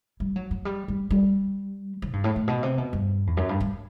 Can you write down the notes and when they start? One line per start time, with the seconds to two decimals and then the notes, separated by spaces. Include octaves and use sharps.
0.20 G3
0.36 F#3
0.51 F#3
0.65 G3
0.88 G3
1.11 G3
2.02 F#3
2.09 A2
2.13 G2
2.24 A2
2.36 A2
2.48 B2
2.63 C3
2.78 B2
2.93 G2
3.27 E2
3.37 F#2
3.49 G2
3.60 G2